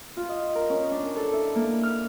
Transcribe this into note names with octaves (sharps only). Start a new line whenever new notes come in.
F4
D#5
A#4
C#4
D4
A4
E4
A#3
F6